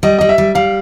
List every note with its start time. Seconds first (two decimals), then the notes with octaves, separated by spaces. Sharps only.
0.03 G3 D#5
0.19 G3 D#5
0.29 E5
0.38 G3
0.55 G3 F5